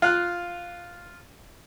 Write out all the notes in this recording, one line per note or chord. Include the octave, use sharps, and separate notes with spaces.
F4 F5 F#6